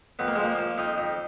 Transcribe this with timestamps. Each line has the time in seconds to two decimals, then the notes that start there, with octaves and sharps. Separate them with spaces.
0.19 F2 B3
0.27 A#3
0.35 G#3
0.39 F3 A#3
0.58 F3
0.78 F2 D#4
0.98 F2